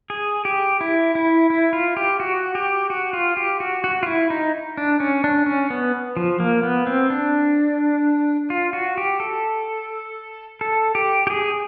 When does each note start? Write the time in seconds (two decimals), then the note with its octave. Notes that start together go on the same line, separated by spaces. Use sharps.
0.10 G#4
0.45 G4
0.81 E4
1.15 E4
1.50 E4
1.73 F4
1.97 G4
2.20 F#4
2.55 G4
2.90 F#4
3.13 F4
3.37 G4
3.60 F#4
3.84 F#4
4.03 F4
4.06 E4
4.30 D#4
4.77 D4
5.00 C#4
5.24 D4
5.46 C#4
5.70 B3
6.17 F3
6.40 A#3
6.63 B3
6.87 C4
7.10 D4
8.50 F4
8.73 F#4
8.98 G4
9.20 A4
10.61 A4
10.95 G4
11.27 G4
11.30 G#4